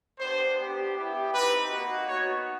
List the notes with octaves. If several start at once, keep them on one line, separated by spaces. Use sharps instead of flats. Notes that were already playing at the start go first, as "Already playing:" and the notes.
B3 D4 G4 C5
B3 D4 G4
B3 E4 G4
C4 D#4 G4 B4
A#3 D#4 F#4
B3 D#4 F#4 C#5